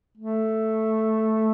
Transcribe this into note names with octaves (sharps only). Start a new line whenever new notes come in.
A3